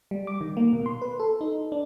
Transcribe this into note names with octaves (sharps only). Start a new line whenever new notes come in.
G3
D6
D#3
A#3
B2
C6
B4
A4
D#4
D4